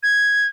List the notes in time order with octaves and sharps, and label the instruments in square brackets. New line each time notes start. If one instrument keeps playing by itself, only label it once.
[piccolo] G#6